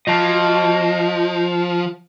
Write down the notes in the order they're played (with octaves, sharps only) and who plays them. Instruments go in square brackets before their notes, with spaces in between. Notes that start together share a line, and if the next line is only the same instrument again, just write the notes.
[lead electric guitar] F3 [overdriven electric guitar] D#5 A5